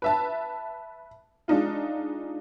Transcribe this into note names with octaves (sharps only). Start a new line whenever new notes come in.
B4 E5 A5
G#3 D4 D#4 F4